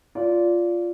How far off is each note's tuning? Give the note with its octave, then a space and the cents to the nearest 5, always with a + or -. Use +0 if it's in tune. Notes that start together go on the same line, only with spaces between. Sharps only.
F4 -5 D5 -20